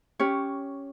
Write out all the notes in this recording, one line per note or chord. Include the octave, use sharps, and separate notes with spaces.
C#4 G4 C#5